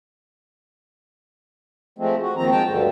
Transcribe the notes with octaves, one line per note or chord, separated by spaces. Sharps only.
F3 G#3 A3 C4
F#4
D#2 D#3 F3 C4 A#5
G#3 G5 A5
D2 G2 D3